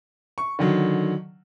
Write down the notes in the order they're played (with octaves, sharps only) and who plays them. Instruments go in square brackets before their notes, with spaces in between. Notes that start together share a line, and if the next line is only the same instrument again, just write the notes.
[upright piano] C#6
D3 D#3 F#3